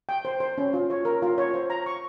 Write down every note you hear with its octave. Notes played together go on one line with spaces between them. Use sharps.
G5
C5
C5
C#4
F4
C#5
A#4
F4
C#5
C5
A#5
C#6